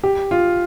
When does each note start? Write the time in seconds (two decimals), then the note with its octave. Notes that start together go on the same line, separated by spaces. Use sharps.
0.03 G4
0.31 F4